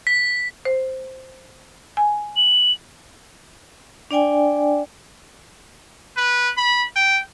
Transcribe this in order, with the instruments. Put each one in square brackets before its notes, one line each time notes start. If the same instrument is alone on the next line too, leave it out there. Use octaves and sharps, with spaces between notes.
[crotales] B6
[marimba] C5
G#5
[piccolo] F#7
[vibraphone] D4 D5 G5 G#5
[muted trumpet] B4
B5
G5